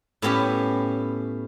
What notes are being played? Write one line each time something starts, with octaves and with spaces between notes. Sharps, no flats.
A2 B3 C#4 G4